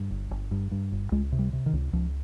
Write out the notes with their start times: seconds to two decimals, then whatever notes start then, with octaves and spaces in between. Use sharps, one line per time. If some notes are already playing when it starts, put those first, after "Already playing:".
Already playing: G2
0.11 G1
0.31 G1
0.51 G2
0.71 G2
0.92 G1
1.12 C#2 G#3
1.32 C3
1.39 G3
1.53 C3
1.66 D#3
1.73 C#2
1.93 C#2 F3